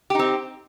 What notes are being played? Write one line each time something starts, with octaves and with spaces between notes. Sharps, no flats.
C4 D#4 G4